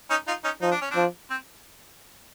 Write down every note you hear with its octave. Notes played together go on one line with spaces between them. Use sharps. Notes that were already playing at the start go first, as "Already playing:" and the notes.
C#4 D#4
D#4 F4
C#4 D#4
F3 D#4
D4
C#4
F3 C4 D4
C4